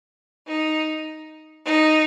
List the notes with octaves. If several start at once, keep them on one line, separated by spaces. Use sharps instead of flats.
D#4
D#4